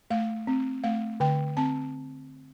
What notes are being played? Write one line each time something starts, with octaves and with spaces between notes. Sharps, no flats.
A3 F5
C4
A3 F5
D3 G5
C4 A5